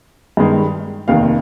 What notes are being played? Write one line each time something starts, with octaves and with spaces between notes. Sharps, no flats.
G2 D#3 G#3
F1 D#2 D#3 F5